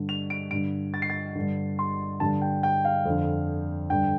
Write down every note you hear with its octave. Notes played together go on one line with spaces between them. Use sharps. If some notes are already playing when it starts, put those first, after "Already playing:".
Already playing: G2 D3
F7
D7
G2 D3 D7
A6
C7
A6
G2 D3
C6
G2 D3 A5
G5
G5
F5
F2
D3
G2 D3 G5